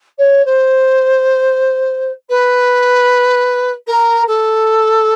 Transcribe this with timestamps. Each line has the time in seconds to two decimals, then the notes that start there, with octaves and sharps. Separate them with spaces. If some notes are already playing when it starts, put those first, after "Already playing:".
0.18 C#5
0.45 C5
2.29 B4
3.87 A#4
4.27 A4